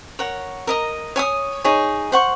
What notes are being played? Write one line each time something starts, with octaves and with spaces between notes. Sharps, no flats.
A#4 C#5 F#5
A#4 D#5 A#5
C#5 G#5 D#6
D#4 G#4 C#5
C5 F#5 C#6